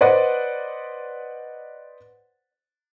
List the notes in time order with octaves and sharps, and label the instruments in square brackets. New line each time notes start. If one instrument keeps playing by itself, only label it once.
[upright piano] B4 C5 D5 D#5 F#5